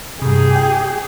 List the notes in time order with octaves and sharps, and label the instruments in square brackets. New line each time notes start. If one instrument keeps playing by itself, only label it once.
[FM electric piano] G2 C3 [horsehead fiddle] G4 G#4
[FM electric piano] G5